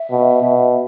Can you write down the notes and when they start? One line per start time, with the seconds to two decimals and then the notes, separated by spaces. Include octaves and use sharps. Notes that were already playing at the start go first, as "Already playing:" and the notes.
Already playing: E5
0.10 B2
0.42 B2